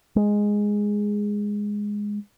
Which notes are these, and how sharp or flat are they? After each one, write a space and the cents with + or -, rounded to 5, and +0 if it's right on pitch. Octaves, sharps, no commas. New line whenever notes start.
G#3 -5